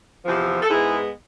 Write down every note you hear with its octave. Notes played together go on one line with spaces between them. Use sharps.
E2 C3 F3
A4
G#2 G#3 B3 E4 G#4